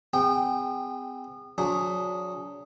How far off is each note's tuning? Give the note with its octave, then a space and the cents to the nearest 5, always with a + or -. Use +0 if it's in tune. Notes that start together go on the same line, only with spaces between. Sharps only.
C4 -35 G#4 -35 G5 -15
F#3 -30 D4 -35 G#4 +0